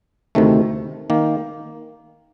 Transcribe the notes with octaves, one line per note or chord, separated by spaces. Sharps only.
D2 C3 D#3 A3
D#3 A#3